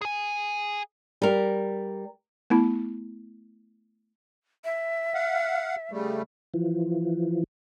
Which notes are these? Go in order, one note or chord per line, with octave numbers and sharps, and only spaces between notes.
G#4 G#5
G3 A#4
A3 B3 E4 B5
E5
F5 F#5
C#3 G3 A3
E3 F3